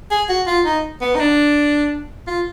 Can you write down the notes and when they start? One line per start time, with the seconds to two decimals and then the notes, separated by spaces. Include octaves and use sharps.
0.11 G#4
0.29 F#4
0.47 F4
0.65 D#4
1.01 B3
1.15 D#4
1.20 D4
2.27 F4